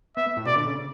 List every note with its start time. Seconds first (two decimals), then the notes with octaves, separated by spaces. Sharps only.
0.17 B3 E5
0.37 A2
0.46 B2 D5
0.56 D3
0.66 C#3